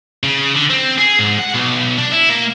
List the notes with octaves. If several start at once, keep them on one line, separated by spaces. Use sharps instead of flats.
C#3
D3
C4
G#4
G#2
F#5
B1
D4
E4
A#3